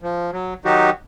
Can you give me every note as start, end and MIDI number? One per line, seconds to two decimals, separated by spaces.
0.02 0.31 53
0.32 0.54 54
0.65 0.90 51
0.65 0.90 54
0.65 0.90 63
0.65 0.90 66
0.65 0.90 67